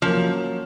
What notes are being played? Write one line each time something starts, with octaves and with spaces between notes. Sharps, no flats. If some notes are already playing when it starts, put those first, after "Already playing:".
F3 F#3 A#3 C#4